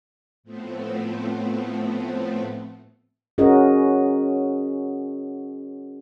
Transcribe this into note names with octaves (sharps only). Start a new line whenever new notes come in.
A2 F3 A3 B3 C4
C#4 F#4 G#4 A#4 D#5